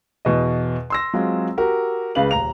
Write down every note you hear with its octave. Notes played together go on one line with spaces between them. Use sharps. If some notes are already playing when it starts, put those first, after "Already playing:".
E2 B2 D#5
C6 E6 A#6
F#3 G#3 C4 F4
F#4 G4 A#4
C#2 C#3 B4 F5 F#7
D#1 A#5 F7